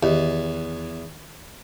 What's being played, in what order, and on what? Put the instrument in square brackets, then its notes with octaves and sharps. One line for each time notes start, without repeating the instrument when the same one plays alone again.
[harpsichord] E2 [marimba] D#3 G4